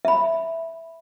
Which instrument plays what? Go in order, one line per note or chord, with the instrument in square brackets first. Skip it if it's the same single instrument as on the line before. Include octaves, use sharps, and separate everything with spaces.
[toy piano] E5 B5